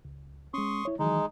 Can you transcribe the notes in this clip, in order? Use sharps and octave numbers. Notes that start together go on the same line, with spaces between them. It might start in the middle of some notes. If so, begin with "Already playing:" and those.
C#2
G#3 C#4 C6 C#6 D#6
E4 C#5
D#3 E3 F#3 G#3 D#4